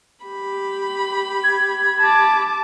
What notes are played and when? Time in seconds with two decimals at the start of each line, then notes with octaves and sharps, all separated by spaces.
0.25 G4 B5
1.43 G#6
2.01 A5 D6